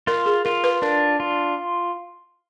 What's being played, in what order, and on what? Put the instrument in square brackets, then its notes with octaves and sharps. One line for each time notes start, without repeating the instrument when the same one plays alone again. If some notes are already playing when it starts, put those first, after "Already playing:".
[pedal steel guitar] F4 [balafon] A#4
[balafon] G#4
[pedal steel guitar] F4 [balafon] A#4
[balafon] B4
[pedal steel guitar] D4 [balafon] A#4
[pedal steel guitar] F4